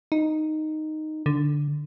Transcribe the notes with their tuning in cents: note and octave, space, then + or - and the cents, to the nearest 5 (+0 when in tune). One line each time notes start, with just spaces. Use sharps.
D#4 -5
D3 -5